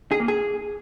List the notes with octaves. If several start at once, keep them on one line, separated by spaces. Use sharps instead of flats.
G#4
A#3
G#4